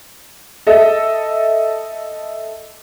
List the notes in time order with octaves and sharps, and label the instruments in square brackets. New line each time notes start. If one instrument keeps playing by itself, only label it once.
[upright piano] A4 D#5 E5